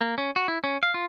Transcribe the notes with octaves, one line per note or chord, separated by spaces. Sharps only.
A#3
C#4
F#4
E4
C#4
F5
F4